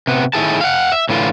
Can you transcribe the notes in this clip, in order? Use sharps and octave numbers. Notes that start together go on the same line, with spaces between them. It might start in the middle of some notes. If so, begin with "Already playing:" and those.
C3 B3
A2 D#3 E4 G#4 A5
F5 F#5
E5
A2 D3 E3 F4